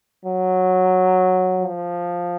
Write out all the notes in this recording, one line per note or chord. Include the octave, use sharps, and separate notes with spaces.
F#3
F3